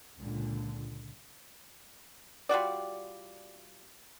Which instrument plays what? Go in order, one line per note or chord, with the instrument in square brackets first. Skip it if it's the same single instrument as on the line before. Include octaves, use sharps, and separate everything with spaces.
[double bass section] C#2 A#2 D3
[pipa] G3 F4 F#4 D5